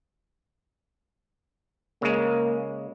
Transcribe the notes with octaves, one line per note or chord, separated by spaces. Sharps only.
C#3 G#3 A#3